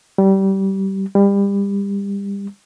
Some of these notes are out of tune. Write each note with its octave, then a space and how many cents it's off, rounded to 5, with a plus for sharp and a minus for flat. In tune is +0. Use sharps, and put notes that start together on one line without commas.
G3 -20
G3 +30